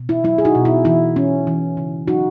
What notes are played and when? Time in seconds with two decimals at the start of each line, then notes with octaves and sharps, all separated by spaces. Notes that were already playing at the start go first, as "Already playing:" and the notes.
Already playing: B2
0.09 E4
0.24 F#3 E4
0.38 G#4
0.45 D#4 F#4
0.55 B2
0.65 E4
0.85 E3 E4
1.16 C#4
1.47 E3
1.77 C#3
2.08 F#3 D#4 F#4